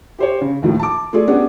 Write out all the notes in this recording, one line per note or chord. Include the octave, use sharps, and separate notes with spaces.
G4 C5 C#5
C#3
D#2 A2 D#3 F3
A5 D6
A3 F4 G#4 D5
B3 C#4 D4 G4 G#4 F#5